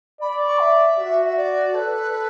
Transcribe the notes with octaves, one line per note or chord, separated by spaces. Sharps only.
D5 B5
C#6
E5
F#4
D5
A4 B4